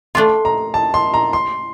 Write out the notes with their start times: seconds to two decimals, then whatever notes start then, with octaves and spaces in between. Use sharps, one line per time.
0.15 A3 D4 F4 C6
0.45 A#5
0.74 A5
0.94 C6
1.14 A#5
1.33 C6